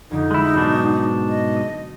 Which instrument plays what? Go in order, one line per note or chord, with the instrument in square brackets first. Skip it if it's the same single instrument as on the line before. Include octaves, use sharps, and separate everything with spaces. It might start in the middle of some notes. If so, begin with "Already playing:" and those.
[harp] F2 D3 [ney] D#4
[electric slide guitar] G#3 E4
[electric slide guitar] G#2 B2 D4 [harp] F#3
[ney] D#5
[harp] D#6